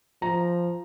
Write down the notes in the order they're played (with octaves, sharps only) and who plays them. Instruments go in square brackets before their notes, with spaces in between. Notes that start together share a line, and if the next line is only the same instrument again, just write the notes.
[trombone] F3 [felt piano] A#5